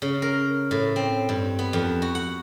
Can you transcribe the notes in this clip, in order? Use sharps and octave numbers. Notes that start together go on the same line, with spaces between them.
C#3
A#4
A2
C4
G2
B3
F2
F#4
F#5